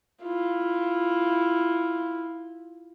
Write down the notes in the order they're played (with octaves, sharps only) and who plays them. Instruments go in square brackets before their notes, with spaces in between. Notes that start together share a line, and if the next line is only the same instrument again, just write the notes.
[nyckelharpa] E4 F4